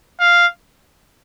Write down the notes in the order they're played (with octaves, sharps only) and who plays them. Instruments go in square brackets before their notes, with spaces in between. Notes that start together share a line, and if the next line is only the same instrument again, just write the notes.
[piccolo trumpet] F5